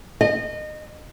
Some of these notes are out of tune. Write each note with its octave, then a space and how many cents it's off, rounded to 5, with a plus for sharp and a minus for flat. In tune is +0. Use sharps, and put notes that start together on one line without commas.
D#5 -25